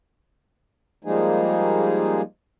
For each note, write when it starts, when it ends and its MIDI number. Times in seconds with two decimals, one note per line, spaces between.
1.04 2.22 53
1.04 2.22 55
1.04 2.22 56
1.04 2.22 58
1.04 2.22 63
1.04 2.22 68